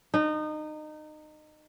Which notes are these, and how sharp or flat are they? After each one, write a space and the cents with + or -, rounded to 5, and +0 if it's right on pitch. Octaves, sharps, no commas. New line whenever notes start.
D#4 -25